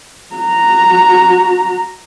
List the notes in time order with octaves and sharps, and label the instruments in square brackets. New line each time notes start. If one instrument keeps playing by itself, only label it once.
[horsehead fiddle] F#4 A#5